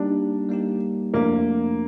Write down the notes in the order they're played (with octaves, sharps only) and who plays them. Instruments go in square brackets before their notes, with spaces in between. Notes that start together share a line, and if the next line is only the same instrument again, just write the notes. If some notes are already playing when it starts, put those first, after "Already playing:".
Already playing: [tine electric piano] G3 A#3 D#4 G4 [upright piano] D4
[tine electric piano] G3 A#3 D#4 G4
[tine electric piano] F2 C3 F3 A3 D4 [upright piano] A#3